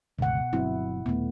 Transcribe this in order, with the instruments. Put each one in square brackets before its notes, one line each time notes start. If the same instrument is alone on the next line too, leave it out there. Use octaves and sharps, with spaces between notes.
[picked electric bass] G1 C#2 [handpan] B2 F#5
[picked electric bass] G1 F#3 C4 [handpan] E4
[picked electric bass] D#1 [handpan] A3 B3